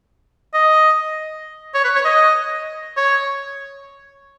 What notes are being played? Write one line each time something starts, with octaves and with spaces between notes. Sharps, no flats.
D#5
C#5
B4
C#5
D#5
C#5